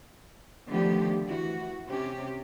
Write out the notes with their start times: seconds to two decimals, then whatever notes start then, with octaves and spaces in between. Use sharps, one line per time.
0.67 D3 D#3 F3 A3 B3 G4
1.25 E3 F#4
1.87 C3 C#4 G4